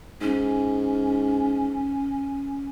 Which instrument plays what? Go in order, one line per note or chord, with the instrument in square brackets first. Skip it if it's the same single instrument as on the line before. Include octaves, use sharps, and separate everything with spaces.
[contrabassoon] G#2 [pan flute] C#4